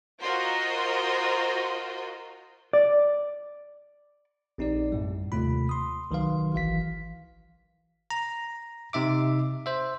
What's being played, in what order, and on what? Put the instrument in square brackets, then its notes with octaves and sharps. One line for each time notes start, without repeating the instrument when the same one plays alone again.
[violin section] F4 F#4 A#4 C5 D#5
[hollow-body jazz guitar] D5
[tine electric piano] A#1 C4 D#4 G4 D5
F#2 A2 G3
D#2 C3 A3 F4 B5
C6 D#6
C2 D#3 F#3 B4 F5 C6
G#1 E3 F5 B6
A#5
C3 D#4 E5 D6
C5 E5